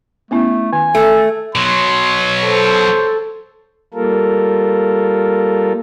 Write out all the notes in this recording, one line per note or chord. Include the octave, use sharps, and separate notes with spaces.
A3 B3 C#4 E4
D#3 G#5
A3 A4
B2 F#3 C#5 C6
A4 C5
G3 A#3 F4 A4 A#4